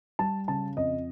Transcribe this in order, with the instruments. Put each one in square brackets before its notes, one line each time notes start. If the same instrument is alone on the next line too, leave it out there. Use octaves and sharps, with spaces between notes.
[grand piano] G3 A5
C#3 A5
F2 D#5